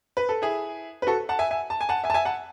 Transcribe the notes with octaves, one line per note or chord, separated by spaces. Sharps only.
B4
A4
E4 G#4
B4
F#4 A4
F#5 A5
E5 G#5
E5 G#5
A5
G#5
F#5 A5
E5 G#5
A5
E5 G#5
F#5 A5